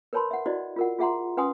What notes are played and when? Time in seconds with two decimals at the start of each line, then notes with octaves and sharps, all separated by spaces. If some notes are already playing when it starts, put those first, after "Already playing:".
0.13 A#4 B4 C#5 A5 B5 C6
0.31 E5 F#5
0.46 E4 F#4 C5 D5 D#5
0.76 F4 A#4 F#5
0.99 F4 G#4 E5 F#5 A#5 C6
1.37 C#4 B4 F#5 G#5 C6 D#6